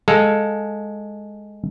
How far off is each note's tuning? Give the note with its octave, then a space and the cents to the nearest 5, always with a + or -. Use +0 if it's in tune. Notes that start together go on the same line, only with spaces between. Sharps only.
G#3 +0 A4 +0 F5 +0